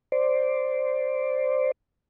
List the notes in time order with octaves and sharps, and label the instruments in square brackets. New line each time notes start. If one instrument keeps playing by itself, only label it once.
[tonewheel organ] C5 D5